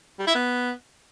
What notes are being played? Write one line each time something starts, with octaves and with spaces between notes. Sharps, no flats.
G3
E4
B3